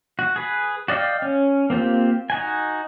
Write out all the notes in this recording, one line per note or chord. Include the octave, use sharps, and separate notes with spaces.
F#4
G#4 B4
F#4 D5 D#5 F5 G5
C#4
A#3 C4 F4 G4
D#4 F#4 G#5